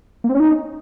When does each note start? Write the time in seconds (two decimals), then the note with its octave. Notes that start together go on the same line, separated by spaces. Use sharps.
0.24 A#3
0.29 C4
0.35 C#4
0.40 D#4